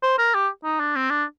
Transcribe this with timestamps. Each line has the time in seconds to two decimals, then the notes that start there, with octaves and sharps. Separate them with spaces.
0.03 C5
0.19 A#4
0.34 G4
0.64 D#4
0.80 D4
0.96 C4
1.10 D4